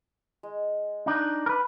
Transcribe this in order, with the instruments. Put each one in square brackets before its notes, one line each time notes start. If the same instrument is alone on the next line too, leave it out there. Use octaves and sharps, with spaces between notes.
[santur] G#3
[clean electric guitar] D4 D#4
A#4 B4